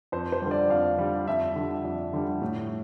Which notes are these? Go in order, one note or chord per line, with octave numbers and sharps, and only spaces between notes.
F2 C5
C5
D3 G3
D5
F2 F5
D3 G3
F2 E5
D3 G3
F2
D3 G3
A2